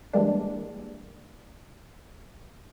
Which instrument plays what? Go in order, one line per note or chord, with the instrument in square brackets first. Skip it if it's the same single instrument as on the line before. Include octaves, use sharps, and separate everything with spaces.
[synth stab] E3 G3 G#3 A#3 D4